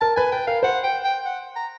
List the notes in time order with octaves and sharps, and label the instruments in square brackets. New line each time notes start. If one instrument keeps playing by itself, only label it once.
[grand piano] A#4 [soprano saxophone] A5
[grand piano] B4 [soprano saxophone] G#5
[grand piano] B4 [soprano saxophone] G5
[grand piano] A#4 [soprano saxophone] F5
[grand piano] C5 [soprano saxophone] F#5
[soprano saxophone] G5
G5
F#5
A#5